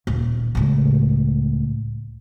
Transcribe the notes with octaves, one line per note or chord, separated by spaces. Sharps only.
D#1
C#2 A2